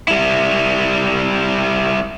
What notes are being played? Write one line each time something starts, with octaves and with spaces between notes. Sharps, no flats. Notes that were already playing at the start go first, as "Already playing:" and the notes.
G3 E4